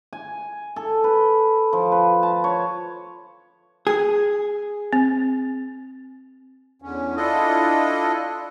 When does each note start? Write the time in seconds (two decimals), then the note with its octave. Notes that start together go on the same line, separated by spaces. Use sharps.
0.13 G#5
0.76 A4
1.04 B4
1.73 F3
1.92 B4
2.23 A5
2.44 C#5
3.87 G#4
4.93 C4
6.82 E2 D3 C#4
7.16 D4 E4 F4 A4 D#5